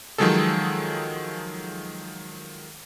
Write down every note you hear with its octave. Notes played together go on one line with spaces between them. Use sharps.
D#3 F3 F#3 G#3 G#4 A4